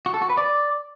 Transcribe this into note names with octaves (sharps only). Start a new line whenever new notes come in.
F#4
A4
F#4
B4
D5